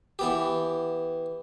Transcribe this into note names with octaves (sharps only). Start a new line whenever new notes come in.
E3 B3 G4